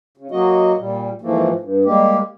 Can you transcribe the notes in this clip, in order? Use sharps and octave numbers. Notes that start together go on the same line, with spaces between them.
C#3
F#3 A#3 F#4 D#5
A#2 G3
G#2 E3 F3 A3 A#3
G2
G3 G#3 A#3 G4